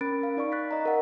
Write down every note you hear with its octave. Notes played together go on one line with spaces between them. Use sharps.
C#4 A#4 B5 F#6 A6 D7
F5
D#4 D5 F5 C#6
F#6 A6 B6
D#5 A#5 B6
A#4 F#5